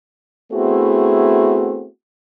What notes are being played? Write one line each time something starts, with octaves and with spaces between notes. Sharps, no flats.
A3 B3 C4 E4 F#4 G#4